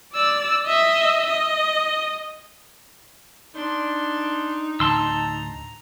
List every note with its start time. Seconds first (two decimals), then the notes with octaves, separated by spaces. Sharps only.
0.14 D5 E6
0.66 D#5 E5
1.27 D#5
3.55 D4 D#4 C6
4.80 D2 A2 D3 A5 A#5 C6 E6